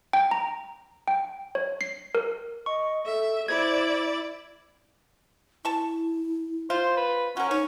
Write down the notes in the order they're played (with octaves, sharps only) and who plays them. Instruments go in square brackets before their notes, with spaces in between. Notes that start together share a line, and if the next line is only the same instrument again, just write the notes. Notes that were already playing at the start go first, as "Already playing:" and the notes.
[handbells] G5
A#5
G5
C#5
C7
A#4
[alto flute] D#5 [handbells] C#6
[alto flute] A4 [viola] E5
[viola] E4 D5 [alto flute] C5 [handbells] G#6
[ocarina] E4 [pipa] A5 C#6
[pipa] F4 [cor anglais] C5
[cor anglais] B4
[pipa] F#3 A#4 [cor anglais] C#4 [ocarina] F#5
[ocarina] D#4 [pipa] C#5